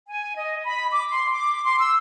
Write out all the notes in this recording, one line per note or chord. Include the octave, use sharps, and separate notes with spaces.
G#5
D#5
B5
D6
C6
D6
C6
E6